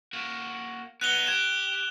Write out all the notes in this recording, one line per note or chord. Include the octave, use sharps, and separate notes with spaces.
A#3 F#4
B3 D#4 F#6 F7 G7
G4 G#6 E7